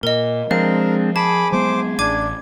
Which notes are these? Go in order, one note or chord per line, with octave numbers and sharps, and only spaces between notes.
A#2 A#4 D#5
F3 G#3 C4 D4 A#4 F5
G#4 A5 B5 D6
F#3 G#3 B3 C5 D6
A1 D4 D6 G#6 D#7